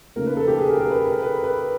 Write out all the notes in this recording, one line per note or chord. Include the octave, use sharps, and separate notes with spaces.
C#3 F3 A#3 D#4 A#4
B4
A4
G4
G#4
A#4
A#4
B4
A#4
B4
B4